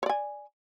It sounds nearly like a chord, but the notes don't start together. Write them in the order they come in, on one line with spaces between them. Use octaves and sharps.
C#5 D5 G#5